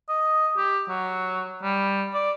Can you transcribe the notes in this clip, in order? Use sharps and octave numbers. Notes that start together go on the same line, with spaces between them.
D#5
G4
F#3
G3
D5